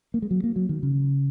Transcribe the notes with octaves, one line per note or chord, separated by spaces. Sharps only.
A#3
G#3
F#3
A#3
F#3
D#3
C#3